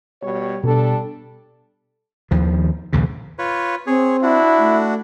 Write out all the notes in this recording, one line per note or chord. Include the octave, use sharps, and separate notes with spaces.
B2 G3 C#5
B2 G3 B3 D4 A4
D#2 D#3 F3
A#1 D#2 C#3
F4 B4 C#5
C4 G#4 C#5
D4 E4 F#4
A3